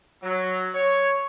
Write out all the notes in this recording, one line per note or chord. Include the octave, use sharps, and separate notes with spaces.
F#3
C#5